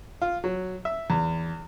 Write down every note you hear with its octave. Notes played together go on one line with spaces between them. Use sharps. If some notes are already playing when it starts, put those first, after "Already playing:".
F4
F#3
E5
E2